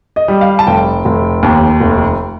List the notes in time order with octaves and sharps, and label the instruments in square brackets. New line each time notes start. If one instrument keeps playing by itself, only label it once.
[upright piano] D#5
G3
F5
A5
F1 G5
F1
D#2
F1